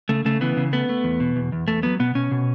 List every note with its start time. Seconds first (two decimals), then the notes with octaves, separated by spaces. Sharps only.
0.09 C#3 A3
0.25 C#3 A3
0.41 E3 B3
0.57 C#3
0.73 A3 B3
0.89 A3
1.04 E2
1.20 B2
1.36 E2
1.52 E2
1.68 E2 A3
1.83 F#3 B3
1.99 B2 B3
2.15 B2 C#4
2.31 B2